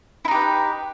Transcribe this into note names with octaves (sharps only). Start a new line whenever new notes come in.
D#4 E4 G4 B4